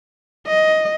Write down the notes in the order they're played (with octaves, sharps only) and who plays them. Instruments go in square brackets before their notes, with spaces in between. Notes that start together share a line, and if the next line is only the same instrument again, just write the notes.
[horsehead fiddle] D#5